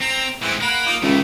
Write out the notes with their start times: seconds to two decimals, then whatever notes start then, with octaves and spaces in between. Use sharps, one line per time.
0.01 C4 A#5
0.42 A2 E3 G#3 C4
0.61 A#3 A#4 F#5 B5
0.87 D#4 F4 D6
1.03 C#2 D#3 E3 A3